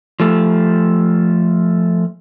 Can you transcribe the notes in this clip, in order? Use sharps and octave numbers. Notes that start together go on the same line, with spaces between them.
F3 A3